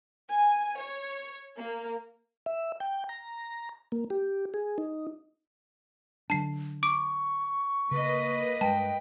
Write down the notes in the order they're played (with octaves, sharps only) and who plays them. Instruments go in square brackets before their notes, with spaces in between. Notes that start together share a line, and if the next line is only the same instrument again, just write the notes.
[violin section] G#5
C#5
A#3
[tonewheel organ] E5
G5
A#5
A#3
G4
G#4
D#4
[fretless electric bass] D3 F#3 D4 [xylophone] A5 C7
[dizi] C#6 [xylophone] D6 D7
[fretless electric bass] C#3 [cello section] A#3 B4 D#5
[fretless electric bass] G2 G#3 [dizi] G5 [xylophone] A5